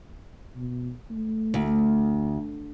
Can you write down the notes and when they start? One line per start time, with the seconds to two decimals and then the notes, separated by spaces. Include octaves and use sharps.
0.56 B2
1.11 A3
1.54 D2